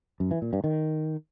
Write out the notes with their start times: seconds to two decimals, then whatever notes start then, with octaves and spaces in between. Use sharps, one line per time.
0.20 F#2
0.31 E3
0.42 A#2
0.53 G2
0.64 D#3